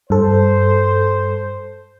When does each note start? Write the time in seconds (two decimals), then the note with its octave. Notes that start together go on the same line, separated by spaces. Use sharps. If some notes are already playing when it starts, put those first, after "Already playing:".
0.10 G2 A4 C5